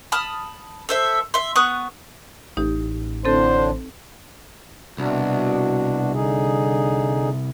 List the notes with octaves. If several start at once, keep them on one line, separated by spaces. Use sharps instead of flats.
A5 B5 D#6 F6
A4 C5 E5
E5 C6
B3 C#6 D#6 F#6
A1 D#4 G4
A2 D3 C4 D4 A4 C5
C2 B2 D4 F#4
D3 D#4 G#4